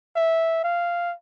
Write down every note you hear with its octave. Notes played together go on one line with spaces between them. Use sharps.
E5
F5